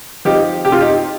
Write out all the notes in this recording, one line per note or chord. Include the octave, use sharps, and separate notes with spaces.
F3 D#4 G4
C3 G4
F4
D#4 G4